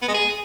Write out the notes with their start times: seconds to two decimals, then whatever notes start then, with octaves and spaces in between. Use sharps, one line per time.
0.02 B3
0.08 G#3
0.14 G#4